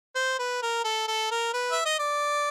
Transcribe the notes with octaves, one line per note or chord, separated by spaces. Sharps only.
C5
B4
A#4
A4
A4
A#4
B4
E5
D#5
D5